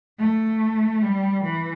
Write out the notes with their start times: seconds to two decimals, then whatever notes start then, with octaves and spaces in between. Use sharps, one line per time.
0.19 A3
1.02 G3
1.44 E3